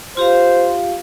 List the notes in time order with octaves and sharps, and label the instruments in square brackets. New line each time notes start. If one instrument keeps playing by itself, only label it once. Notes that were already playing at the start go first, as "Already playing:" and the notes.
[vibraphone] F4 G4 F5 [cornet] C5